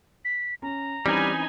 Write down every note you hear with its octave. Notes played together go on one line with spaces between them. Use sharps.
B6
C#4 A#5
E3 G3 C4 C#4 D#4 G#5 B5